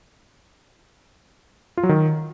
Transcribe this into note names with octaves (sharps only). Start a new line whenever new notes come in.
F4
F#3
D#3